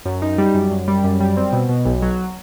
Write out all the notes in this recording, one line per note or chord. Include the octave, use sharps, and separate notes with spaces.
F#2
D#4
G3
F#2
F#2
G3
F#2
G3
C4
B2
B2
B1
F#3